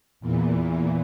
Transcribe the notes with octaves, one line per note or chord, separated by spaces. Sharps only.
E2 A#2 E3